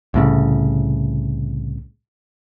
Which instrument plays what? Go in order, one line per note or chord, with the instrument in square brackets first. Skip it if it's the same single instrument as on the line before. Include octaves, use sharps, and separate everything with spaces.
[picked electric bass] C2 A2 C#3